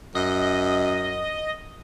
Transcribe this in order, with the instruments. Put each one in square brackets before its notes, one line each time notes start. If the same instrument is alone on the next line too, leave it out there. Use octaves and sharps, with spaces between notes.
[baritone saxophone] F#2 [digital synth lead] D#5